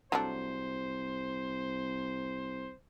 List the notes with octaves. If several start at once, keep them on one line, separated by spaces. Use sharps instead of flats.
C2 F#3 A3 D4 C5